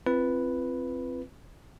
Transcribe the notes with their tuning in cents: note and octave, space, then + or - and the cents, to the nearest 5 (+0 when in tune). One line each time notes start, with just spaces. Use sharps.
C4 +0 F4 -35 B4 +0